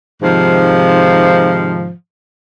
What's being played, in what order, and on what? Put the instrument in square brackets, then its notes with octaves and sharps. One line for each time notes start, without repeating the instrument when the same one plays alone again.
[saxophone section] G#2 C3 D#3 F3